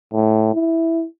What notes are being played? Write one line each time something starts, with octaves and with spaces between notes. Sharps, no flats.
A2
E4